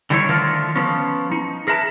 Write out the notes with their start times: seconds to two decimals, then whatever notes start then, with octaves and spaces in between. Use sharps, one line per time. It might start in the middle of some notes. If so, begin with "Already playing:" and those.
0.10 D3 D#3 G3 E4 G#4 C#5
0.29 D3 D#3 F3 A3 F4 A#4
0.76 F3 B3 C#4
1.32 D#4
1.67 G#4 A#4 B4 E5 A5